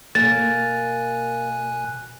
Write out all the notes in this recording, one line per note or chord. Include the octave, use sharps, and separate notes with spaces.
B2 A#3 G#5 F#6 A6